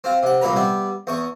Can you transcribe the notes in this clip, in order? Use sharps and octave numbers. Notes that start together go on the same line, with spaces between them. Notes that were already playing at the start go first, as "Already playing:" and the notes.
C4 F4
C3 F#5
C2 A#2 B4 A#5
G3 B3 E5
E2 C#6 D#6